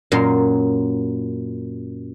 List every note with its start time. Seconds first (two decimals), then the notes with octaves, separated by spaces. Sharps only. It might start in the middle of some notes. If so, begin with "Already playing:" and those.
0.12 F#2 A#2 C6